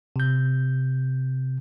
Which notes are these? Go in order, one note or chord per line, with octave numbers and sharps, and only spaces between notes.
C3 G6